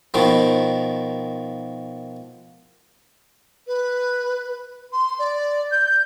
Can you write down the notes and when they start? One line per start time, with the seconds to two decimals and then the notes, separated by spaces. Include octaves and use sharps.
0.14 B2 D#3 F3
3.66 B4
4.92 C6
5.19 D5
5.71 G6